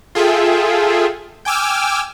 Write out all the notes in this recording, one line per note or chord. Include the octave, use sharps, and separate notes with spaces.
F4 G#4 A4 E5 G5
G5 G#5 D6 E6 F6